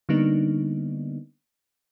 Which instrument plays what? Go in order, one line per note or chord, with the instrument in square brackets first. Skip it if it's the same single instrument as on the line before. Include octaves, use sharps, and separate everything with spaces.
[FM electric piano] D3 G3 A#3 B3 D4 D#4